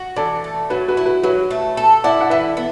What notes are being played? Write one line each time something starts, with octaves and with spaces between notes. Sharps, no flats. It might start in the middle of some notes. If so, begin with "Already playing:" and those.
Already playing: F#4
E3 A4 D5
A3
F#3 F#4 B4
F#4 B4
E4
F#4 B4
F#3 F#4 B4
A3
A4
E4 D5 F#5
F#5
E3 B4 E5
B3